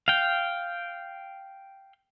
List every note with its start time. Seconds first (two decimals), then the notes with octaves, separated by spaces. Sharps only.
0.08 F5 G5